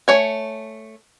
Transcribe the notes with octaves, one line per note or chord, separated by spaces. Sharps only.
A3 C#5 G#5